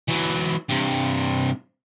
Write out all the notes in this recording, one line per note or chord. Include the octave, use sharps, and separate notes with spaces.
E3 F#3
G2 C3